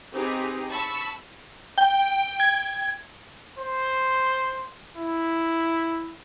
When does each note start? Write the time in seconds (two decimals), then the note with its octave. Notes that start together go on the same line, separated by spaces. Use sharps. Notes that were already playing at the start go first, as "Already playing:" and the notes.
0.12 C4 D#4 G4 G#4 B4
0.70 A5 B5 C#6 E6
1.78 G5
2.40 G#6
3.58 C5
4.96 E4